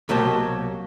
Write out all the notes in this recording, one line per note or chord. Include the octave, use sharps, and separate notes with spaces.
C2 B2 F#3 A#3 G4 A5